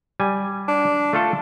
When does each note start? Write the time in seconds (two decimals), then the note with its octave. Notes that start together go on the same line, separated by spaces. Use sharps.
0.20 G3 G#5
0.68 D4
1.13 A3 F4 A4